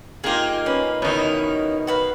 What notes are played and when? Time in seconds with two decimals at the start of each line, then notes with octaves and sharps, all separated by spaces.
0.24 A#3 D#4 F4 G4 G#4
0.66 C#4 B4
1.02 B2 D#3 C#4 D#4 E4
1.87 F#4 B4 F5